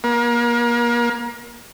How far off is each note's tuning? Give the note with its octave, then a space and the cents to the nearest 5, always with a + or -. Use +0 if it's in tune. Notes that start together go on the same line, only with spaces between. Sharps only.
A#3 +35